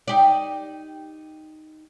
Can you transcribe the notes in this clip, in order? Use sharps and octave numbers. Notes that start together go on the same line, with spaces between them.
D#4 G4 D5